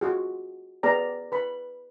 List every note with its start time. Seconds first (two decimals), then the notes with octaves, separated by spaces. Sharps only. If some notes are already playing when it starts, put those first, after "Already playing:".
0.01 F4 F#4 G#4
0.83 B3 G#4 D5 A#5
1.32 B4 B5